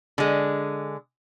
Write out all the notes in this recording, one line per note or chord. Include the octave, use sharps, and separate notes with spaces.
D3 G#3